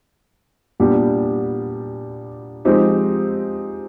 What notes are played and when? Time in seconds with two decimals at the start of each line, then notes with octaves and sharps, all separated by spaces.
0.80 A#2 G3 B3 D4 G4
2.65 F3 G#3 C4 D#4 G4